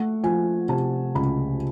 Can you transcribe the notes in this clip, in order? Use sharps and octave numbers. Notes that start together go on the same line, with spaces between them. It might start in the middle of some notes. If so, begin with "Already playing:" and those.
Already playing: A3 F#5
F3 G#5
C3 A5
C#2 B5